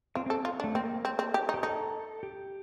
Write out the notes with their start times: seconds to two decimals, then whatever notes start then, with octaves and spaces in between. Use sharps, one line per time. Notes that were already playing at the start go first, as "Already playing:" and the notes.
0.15 C4 F4
0.26 C4 A4
0.45 F4
0.60 D4
0.64 A3
0.75 A#3 C4
1.05 C4
1.19 C4
1.34 G4
1.49 D#4
1.54 G4
1.63 D#4 A4
2.23 G4